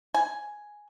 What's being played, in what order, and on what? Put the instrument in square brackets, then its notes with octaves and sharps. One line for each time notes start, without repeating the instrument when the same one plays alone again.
[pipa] G#5